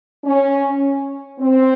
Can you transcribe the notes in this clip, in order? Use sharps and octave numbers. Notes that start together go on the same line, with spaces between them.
C#4
C4